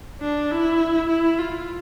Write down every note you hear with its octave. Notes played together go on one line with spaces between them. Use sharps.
D4
E4
E4
F4